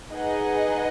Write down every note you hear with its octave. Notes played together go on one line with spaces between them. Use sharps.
D#4 G#4 B4 D#5 F#5